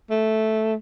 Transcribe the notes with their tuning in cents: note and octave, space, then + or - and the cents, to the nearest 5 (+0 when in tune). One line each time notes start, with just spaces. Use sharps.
A3 -5